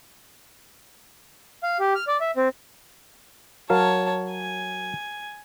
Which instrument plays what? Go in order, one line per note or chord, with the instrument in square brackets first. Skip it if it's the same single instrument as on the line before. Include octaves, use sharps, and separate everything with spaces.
[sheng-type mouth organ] F5
G4
F6
D5
E5
C4
[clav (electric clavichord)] F#3 A#4 F5 [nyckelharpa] C#5 A5
[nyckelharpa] G#5